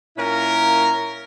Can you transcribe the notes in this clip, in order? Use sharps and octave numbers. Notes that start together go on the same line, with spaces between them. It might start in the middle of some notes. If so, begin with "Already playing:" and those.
A#2 A#3 C#4 E4 A#4